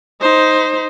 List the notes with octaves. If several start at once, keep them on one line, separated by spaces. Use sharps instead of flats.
D#4 C5